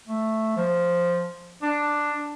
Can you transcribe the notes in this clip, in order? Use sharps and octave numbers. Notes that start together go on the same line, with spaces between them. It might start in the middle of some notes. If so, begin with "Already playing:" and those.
A3
F3
D4